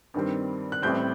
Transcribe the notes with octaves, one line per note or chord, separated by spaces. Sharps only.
G2 D#3 G3 C4
F#6
A1 A2 G3 C4 G6